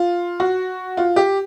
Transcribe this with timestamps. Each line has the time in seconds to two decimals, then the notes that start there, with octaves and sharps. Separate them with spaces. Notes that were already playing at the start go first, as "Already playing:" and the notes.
Already playing: F4
0.40 F#4
0.97 F4
1.16 G4